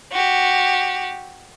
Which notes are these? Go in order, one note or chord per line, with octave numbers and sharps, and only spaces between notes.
F#4 G4